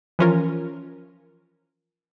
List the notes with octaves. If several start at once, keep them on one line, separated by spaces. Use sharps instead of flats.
E3 F3 C#4 F4 A#4